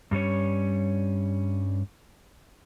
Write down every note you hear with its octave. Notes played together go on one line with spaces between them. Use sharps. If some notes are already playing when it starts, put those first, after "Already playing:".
G2 G3 C#4 C#5